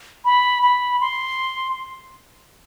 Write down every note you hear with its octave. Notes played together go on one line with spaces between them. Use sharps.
B5
B5
C6